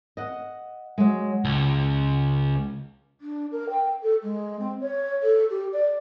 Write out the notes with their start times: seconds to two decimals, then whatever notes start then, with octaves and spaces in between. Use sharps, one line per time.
0.17 D#5 F#5
0.98 F#3 G#3
1.45 C#2
3.21 D4
3.52 A#4
3.69 G5
4.02 A4
4.23 G#3
4.59 C4
4.81 C#5
5.23 A4
5.50 G4
5.73 D5